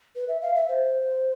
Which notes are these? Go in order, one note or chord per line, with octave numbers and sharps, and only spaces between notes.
B4
E5
F5
E5
C5